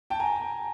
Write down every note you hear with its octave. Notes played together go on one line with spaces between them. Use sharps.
G5 A5
G#5 A#5